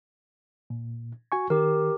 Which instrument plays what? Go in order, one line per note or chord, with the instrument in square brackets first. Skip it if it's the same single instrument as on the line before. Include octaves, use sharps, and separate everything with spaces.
[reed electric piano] A#2
F#4 G#5 C#6
[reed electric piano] D#3 [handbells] G4 A#4